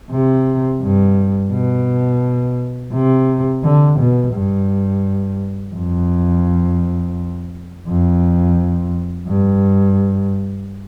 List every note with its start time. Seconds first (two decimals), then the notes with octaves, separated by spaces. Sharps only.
0.11 C3
0.82 G2
1.52 B2
2.93 C3
3.63 D3
4.00 B2
4.35 G2
5.75 F2
7.88 F2
9.27 G2